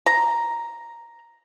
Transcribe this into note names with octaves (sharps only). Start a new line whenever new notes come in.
A#5